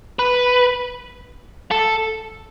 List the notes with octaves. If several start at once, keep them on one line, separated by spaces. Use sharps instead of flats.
B4
A4